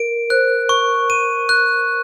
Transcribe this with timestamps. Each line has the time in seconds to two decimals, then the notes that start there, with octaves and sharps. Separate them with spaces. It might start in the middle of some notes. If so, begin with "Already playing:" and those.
Already playing: A#4 D7
0.30 C5 F#6
0.69 C#6
1.10 D#7
1.49 F#6